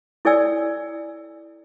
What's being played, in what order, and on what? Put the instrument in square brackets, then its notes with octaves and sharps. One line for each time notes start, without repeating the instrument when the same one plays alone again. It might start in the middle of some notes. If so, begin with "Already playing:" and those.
[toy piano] E4 A4 C#5 D5 G#5 E6